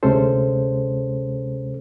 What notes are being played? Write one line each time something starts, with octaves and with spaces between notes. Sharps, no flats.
D2 C3 G#3 C#4 A4 C5